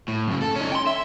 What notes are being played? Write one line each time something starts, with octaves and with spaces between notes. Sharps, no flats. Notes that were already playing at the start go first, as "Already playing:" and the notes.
A2
F#2 C#3
A4
C#4 D#4
G5 C6
E5